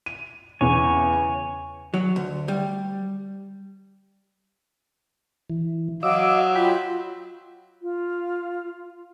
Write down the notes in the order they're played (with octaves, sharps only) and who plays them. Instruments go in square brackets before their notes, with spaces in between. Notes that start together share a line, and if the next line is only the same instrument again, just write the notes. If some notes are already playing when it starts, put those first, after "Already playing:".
[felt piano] D#7
[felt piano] E2 C#3 [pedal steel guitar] C#5 G#5
[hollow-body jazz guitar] F#3
D2
G3
[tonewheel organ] E3
[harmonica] F#3 [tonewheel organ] D#5 D6 E6 [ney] F5
[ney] F4 [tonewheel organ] G5 B5
[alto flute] F4